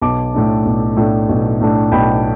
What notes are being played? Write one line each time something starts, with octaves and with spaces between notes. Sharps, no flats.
B1 A5 D6
A2 A3 D4
B1
A2 A3 D4
B1
A2 A3 D4
B1 G5 B5